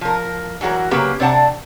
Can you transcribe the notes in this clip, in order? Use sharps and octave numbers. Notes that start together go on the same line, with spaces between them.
F3 A#4
E3 F#3 F#4 A4 A#4
C#3 F#3 A#3 G4 B4
C3 D4 C5 F#5 A5 A#5